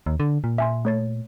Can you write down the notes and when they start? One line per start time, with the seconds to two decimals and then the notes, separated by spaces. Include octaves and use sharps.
0.06 D#2
0.20 D3
0.44 A#2
0.58 E5 G#5 C6
0.85 A3 C#5 A6